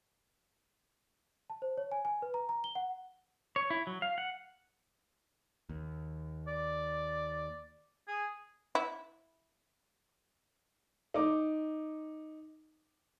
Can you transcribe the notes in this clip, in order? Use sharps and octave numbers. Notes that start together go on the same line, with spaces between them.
A5
C5
C#5
G#5
G#5
B4
A#5
A#5
G7
F#5
C#5
E4
F#3
F5
F#5
D#2
D5
G#4
E4
D#4 D6